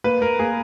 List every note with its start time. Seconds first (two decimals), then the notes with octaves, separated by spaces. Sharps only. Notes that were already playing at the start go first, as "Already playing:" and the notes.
0.04 A#3 B4
0.21 A#3 A#4
0.39 A#3 G#4